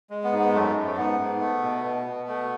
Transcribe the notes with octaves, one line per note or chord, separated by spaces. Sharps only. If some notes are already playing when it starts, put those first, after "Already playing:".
G#3
B3
G#2
B3
F#2 A3
F#2
A3
G#2 B3
G#2
A3
B2
B2
B2
A3